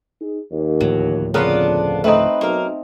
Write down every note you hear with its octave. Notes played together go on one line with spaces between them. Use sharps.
D#4 G#4
D#2
D2 A2 F3 F#3
F2 C#3 B3 D4 F4 A#4 B4
A3 C4 D#4 B4
B1 A#3 A#4